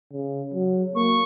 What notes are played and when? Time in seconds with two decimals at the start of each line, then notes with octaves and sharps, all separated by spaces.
0.13 C#3
0.54 F#3
0.95 A#3 C#6